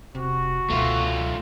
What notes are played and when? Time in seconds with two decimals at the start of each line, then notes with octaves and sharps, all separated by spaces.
0.15 E1 C3 F#4
0.70 C#2 B2 A3 F4